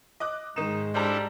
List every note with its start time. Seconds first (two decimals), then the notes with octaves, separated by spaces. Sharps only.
0.20 D#5 D6 F#6
0.56 G#2 D#3 G#3 D#4 E7
0.94 G3 D4 E4 A4 C5 A5 A#5